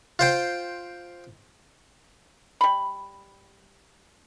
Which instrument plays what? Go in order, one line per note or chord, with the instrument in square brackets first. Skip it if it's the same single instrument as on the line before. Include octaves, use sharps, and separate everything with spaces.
[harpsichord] F4 C5 G5
[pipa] G3 B5